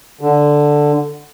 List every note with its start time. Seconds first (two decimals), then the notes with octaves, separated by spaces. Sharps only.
0.21 D3